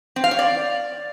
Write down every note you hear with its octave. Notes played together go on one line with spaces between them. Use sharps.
C4
F5
C#5
D5